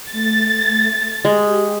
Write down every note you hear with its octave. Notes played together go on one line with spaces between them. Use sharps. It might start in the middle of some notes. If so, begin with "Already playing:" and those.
A3 A6
G#3 G4